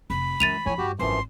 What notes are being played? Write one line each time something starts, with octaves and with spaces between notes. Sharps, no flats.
F1 B5
F#2 E3 G#3 A6 D#7 F7
A2 F3 F4 C#5 G#5
G2 F#4 G4
G#1 F#2 E3 F3 C6